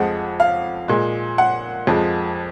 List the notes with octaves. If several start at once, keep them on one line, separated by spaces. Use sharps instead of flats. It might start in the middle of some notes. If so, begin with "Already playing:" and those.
Already playing: F2 F3 G#3 F#5
F5
A#2 G#3
F#5
F2 F3 G#3